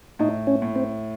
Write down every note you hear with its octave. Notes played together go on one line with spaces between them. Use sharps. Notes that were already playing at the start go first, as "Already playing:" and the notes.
A2 D#4
C#4
A2
C4